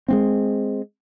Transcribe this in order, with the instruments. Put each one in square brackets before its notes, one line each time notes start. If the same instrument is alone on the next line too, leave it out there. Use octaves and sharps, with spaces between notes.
[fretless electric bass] G#3 B3 C4